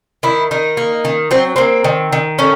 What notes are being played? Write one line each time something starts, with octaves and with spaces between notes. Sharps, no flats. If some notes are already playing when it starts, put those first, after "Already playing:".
D#3 E4
D#3 D#4
A#3
D#3
F#3 C4
A#3 C4
D#3
D#3
A3 C#4